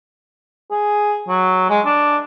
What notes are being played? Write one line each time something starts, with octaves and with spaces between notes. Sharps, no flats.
G#4
F#3
G#3
D4